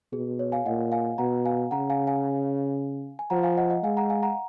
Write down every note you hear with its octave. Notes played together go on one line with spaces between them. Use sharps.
B2 G#4
C#5
F5 G#5
A#2 D#5 F#5
F5 G#5
B2 F#5 A#5
F5 G#5
C#3 F#5 A#5
F5 G#5
F5 G#5
G#5
F3 F#5 A#5
F5 G#5
D#5 F#5
D#5 F#5
G#3 F5 G#5
F#5 A#5
F5 G#5
F#5 A#5